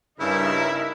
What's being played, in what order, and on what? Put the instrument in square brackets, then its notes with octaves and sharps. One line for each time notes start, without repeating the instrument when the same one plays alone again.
[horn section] G2 C#3 [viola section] D#4 A#4 E5 [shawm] E4